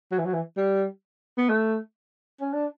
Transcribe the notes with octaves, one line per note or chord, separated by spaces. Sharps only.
F#3
E3
F#3
E3
G3
B3
A3
C#4
D4